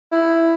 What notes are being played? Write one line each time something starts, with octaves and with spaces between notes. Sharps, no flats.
E4